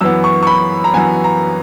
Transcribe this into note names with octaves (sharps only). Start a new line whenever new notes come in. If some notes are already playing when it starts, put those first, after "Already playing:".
F#2 E3 B3 E6
C#6
C#6
B5
A#5
F#2 E3 B3 G#5
A#5